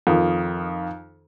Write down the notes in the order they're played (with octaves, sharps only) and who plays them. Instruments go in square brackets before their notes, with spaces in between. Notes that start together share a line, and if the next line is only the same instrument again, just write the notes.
[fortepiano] F2 D#3